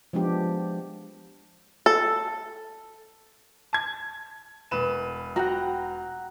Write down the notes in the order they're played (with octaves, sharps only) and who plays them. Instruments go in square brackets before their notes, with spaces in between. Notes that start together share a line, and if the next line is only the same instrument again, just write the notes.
[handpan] F3 G#3 B3 D4 G4
[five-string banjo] A4
[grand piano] A5 G#6
E1 B4 E7
[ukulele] F#4 [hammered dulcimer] F#5 G5 A#5